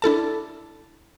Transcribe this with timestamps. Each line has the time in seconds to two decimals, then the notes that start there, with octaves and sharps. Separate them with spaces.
0.02 D4 E4 A4 A5